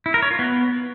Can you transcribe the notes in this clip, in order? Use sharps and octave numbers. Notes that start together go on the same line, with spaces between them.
E4
A#4
C#5
F4
B3